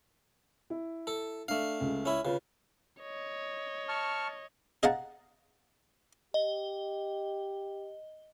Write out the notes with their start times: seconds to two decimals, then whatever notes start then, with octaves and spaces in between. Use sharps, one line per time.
0.70 E4
1.07 A4
1.48 A3 D4 F5
1.80 C#2 C#3
2.05 C#4 E4
2.25 C#3 F4 B4
3.01 C#5 D#5
3.89 A5 C#6 F6
4.83 G#4 D#5 F5 F#5 A5 A#5
6.34 G4 D#5 G7